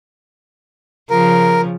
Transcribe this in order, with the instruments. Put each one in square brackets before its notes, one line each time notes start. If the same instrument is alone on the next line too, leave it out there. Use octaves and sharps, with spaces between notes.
[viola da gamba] C#3 F3 [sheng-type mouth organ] A#4